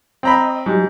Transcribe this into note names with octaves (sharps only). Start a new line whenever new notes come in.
C4 D#5 A#5 B5
G#2 F#3 G3